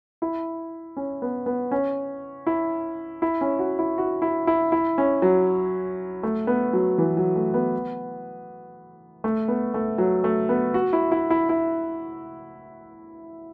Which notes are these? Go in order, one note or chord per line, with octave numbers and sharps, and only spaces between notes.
E4
C#4
B3
B3
C#4
E4
E4
C#4
F#4
E4
F#4
E4
E4
E4
C#4
F#3
A3
B3
F#3
E3
F#3
A3
B3
A3
B3
A3
F#3
A3
B3
F#4
E4
E4
E4
E4